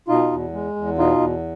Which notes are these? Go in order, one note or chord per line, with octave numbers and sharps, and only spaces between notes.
B2 D#4 F4
E2
G#3
E2
B2 D#4 F4
E2